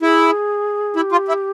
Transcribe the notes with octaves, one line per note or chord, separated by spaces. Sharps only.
E4 G#4
E4 G4
F4
E4